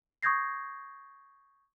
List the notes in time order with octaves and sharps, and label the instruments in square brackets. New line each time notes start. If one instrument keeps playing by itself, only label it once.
[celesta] C#6 D#6 G6 G#6 A#6 C7